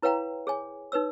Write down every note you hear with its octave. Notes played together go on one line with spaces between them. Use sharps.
E4 B4 C#5 F5 G5 A#5
G#4 C#5 G#5
D#4 B4 C#5 E6